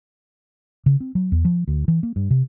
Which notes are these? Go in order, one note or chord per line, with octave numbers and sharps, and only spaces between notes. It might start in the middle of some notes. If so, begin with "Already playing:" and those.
C#3
C4
F#3
E2
F3
D2
E3
A#3
G2
C3